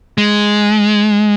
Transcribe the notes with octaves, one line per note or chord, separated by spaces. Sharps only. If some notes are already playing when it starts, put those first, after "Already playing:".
G#3